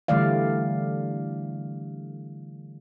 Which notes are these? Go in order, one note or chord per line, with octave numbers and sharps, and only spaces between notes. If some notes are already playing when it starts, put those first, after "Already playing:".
D3 E3 G3 A3 D5 F5